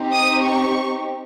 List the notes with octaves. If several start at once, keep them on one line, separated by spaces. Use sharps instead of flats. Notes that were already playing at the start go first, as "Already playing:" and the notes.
Already playing: C4 D#4 G4
D#6
C#6